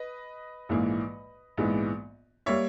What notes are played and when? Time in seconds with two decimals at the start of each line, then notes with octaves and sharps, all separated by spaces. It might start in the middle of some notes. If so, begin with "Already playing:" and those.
Already playing: B4 D#5
0.69 A#1 G#2 E3 A#3
1.57 A#1 G#2 E3 G#3 B3
2.46 G3 A#3 C#5 E5